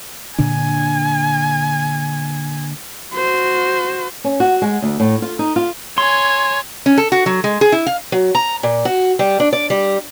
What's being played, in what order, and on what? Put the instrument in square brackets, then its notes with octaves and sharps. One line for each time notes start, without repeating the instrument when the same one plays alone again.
[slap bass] A#2 D3 D4 [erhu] G#5
[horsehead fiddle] F#4 C5
[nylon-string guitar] C#4
F#4
G#3
D2
A2
F4
D#4
F4
[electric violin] C#5 G#5 [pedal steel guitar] C6
[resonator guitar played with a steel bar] C#4
A4
F#4
F#3
G#3
G#4
E4
F5
[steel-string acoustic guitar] F#3
A#5
A#2
F#4
G3
D4
D5
G3